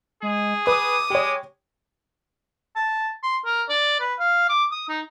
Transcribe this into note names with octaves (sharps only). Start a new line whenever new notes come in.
G#3 G#4
B4 D6 D#6
G#3 G4 C#5
A5
C6
A#4
D5
B4
F5
D6
D#6
D#4